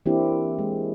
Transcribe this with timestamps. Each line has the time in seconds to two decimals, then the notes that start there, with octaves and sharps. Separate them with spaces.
0.06 E3 A#3 C4 D4 E4 G4
0.59 G#3